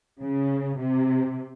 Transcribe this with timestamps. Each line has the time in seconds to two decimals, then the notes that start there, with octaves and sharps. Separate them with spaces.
0.21 C#3
0.77 C3